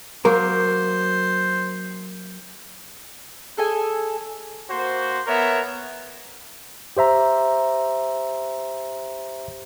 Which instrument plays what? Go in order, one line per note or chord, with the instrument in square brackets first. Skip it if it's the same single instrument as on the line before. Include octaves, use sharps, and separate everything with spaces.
[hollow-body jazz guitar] F#3 A#3 A#4 [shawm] C5
[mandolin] G#4 A4 D#5 G#5
[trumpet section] A#3 F#4 C5
B3 A#4 C#5 E5
[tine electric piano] G4 C5 E5 A#5